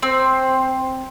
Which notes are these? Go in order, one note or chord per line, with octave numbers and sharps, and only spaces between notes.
C4 C5